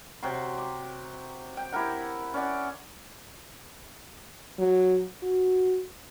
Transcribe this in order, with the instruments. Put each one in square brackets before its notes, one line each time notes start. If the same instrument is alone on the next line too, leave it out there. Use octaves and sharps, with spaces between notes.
[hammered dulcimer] C3 F#3 G5 C6
D6
G5
E4 G4 A#4 F#5
C#4 D5 F#5
[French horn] F#3
F#4